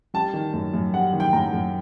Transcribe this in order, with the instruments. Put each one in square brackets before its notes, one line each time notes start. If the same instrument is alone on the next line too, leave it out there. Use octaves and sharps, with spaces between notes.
[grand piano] G3 A5
D#3
F#2
F#2
G3 F#5
D#3
G5
F#2 A#5
F#2